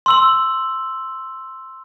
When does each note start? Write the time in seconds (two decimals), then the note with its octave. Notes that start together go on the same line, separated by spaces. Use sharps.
0.06 C6 E6 F#7